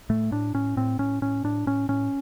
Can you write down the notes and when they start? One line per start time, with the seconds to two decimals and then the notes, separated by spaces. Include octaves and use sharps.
0.09 A2 A3
0.32 A2 D4
0.54 A2 C#4
0.77 A2 C4
0.99 A2 C#4
1.22 A2 C#4
1.44 A2 D4
1.67 A2 C#4
1.89 A2 C#4